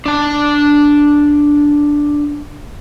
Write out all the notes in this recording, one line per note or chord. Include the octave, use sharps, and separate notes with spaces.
D4 A5